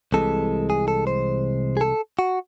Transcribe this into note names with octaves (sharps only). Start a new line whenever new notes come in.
C2 C3 E3 G#3 A4
G#4
A4
C5
G#4
A4
F#4